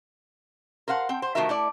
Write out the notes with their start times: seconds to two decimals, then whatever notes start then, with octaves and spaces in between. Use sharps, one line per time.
0.88 A#4 C5 F5 F#5
1.09 C4 G5
1.22 C5
1.35 D#3 F3 A3 F#4 A#4 E5
1.49 A3 E4 D5